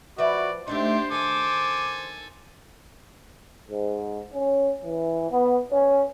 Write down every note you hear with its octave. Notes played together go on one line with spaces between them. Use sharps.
F3 F#4 B4 D5 E5
A3 C4 D4 D#4 G4 C5 C6
D#3 A4 G#5 D6
G#2
C#4
E3
B3
C#4